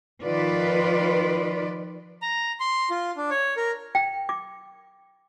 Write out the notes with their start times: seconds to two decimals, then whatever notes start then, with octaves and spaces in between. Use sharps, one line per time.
0.23 D#3 F3 F4 B4 D5
2.22 A#5
2.60 C6
2.90 F4
3.17 D4
3.31 C#5
3.57 A#4
3.95 G5
4.29 D6